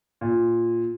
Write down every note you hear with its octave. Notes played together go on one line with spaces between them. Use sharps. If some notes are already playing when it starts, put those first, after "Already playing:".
A#2